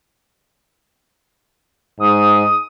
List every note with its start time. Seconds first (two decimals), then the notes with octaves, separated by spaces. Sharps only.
2.00 G#2 D#6